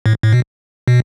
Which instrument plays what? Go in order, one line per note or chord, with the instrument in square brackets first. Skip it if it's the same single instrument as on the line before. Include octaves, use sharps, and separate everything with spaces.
[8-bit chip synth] A2
A2
B2
B2